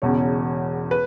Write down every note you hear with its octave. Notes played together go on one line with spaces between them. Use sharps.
E1 E2 C#3 C#5
B4